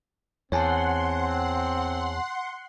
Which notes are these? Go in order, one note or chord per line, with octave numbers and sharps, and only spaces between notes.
E2 C4 C#5 F#5 G#5 A5 C6